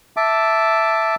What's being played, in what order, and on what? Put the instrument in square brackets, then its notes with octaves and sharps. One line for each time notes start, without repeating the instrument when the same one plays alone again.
[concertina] E5 A5 D6